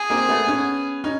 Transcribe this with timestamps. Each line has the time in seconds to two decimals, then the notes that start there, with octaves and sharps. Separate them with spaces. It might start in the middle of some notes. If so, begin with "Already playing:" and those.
Already playing: G#4
0.10 A#3 C4
0.29 A3 B3
0.47 B3 C#4
1.04 C#4 D#4